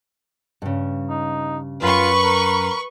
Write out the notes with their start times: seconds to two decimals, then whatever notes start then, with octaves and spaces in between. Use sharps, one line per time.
0.62 G2 C#3
1.10 D#4
1.82 F#2 F4 B4 C#6
2.24 A#4